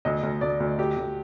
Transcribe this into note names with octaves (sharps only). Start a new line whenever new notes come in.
D2 D#5
D2
D2 D5
D2
D2 G4
D2